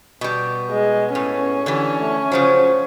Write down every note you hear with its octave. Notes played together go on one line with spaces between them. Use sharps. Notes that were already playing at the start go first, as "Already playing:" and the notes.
B2 G3 B3
G#3
A2 C#4
D3 E3 G4
A3
C#3 F3 F#3 C5